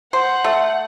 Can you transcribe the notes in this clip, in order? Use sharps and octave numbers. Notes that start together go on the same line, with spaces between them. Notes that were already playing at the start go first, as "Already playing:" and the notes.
C5 F#5
A3